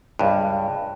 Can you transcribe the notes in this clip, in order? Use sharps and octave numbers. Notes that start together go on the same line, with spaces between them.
C#2 G2